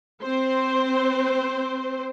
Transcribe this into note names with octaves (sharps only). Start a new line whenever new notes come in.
C4 C5